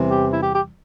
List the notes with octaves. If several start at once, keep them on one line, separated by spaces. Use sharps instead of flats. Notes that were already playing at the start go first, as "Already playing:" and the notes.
Already playing: E2 C3 E3 G3
G4
E4
G4
G4